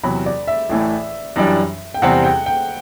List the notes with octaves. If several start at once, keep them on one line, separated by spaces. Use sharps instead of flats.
E2 C3 F#3 B5
D5
E5
A1 A2 E3 A3
F#2 E3 G3 D4
G5
E2 C3 G3 C4 F#5
G5
G5